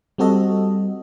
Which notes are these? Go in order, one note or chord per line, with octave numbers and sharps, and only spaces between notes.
G3 C4 F#4 A4 D#5